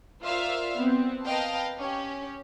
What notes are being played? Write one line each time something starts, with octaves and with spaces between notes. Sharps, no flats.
F4 A#4 C5 D5 E5 F5
B3 C4
A#4 B4 D#5 F5 G5 A5
C#4 G4